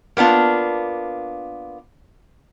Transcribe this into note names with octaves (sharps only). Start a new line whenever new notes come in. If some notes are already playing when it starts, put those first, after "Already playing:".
A#3 B3 D4 F4